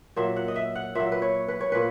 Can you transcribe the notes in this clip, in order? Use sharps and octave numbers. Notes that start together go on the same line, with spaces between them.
A#2 F#3 E5
F#5
D#5
E5
F#5
A#2 F#3 E5
B4
C#5
B4
C#5
A#2 B4